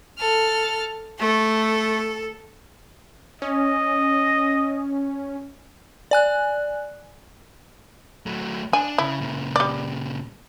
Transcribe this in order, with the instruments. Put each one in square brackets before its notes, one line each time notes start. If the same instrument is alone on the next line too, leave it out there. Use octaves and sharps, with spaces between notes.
[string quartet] A4 F6
[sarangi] A3 [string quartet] A4
[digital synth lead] C#4 [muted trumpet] D#5
[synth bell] D5 G#5 F#6
[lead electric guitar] F#3 A3
[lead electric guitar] D4 [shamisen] G#5
[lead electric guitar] C#3 [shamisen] E4
[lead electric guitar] A#2 C#3
[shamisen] G3 D5